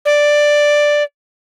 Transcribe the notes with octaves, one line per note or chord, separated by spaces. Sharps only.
D5